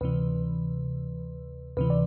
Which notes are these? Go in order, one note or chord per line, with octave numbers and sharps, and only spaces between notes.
D2 C3 E3 B4
D2 C3 E3 B4
D5